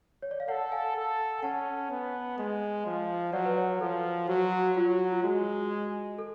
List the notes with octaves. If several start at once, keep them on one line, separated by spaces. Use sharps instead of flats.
C#5
D5
F5
A4 D5 F#5
F5 G#5
A4
G#5
C#4 F#5 A5
B3
G#3
F3
F#3 D5 F#5
B4 D5
C#5
B4
F3 A4
F#3 F#4
F#4
F#3 F4
F4
G#3 F#4
A4